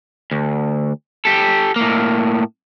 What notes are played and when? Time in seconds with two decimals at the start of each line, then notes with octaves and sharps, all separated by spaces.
0.31 D2
1.25 G4 A4
1.76 A2 A#3